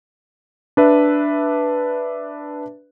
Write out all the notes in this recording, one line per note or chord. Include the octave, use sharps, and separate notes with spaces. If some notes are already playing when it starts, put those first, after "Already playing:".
D4 B4 E5